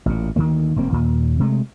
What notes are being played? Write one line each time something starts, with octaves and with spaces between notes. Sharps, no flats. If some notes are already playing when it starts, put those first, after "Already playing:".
A1 A#2
D2 D#3 F3 A#3
F1 F#2 A#3 C4
D#2 A#2
C3 G#3 A3